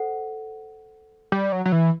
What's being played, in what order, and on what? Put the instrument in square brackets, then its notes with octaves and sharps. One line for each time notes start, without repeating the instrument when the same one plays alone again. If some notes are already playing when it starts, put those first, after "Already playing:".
Already playing: [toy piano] A4 C5 F#5
[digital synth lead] G3
F#3
F#3
E3